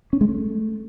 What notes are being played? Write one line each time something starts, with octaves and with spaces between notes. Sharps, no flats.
C#4
G#3
A3